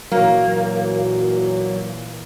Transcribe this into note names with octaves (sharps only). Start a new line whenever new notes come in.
A#2 E3 F#3 A#3